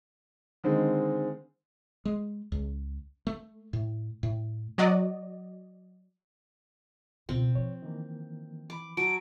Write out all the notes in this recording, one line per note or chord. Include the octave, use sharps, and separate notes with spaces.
D3 D#3 G#3 C4
G#3
C#2
A3
A2
A2
F#3 F#4 D5 D#5
C#2 B2 C4 F4
F3 C#5
D#3 E3 A#3
E3 B5 D6
F#3 A5 D7